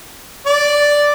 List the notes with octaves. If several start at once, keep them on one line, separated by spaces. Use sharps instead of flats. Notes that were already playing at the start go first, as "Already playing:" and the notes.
D5